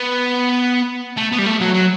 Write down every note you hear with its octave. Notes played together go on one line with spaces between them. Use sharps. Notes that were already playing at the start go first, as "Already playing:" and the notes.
Already playing: B3
A3
B3
G3
A3
F#3
F#3